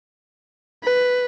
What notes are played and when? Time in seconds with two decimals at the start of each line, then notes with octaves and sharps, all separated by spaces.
0.84 B4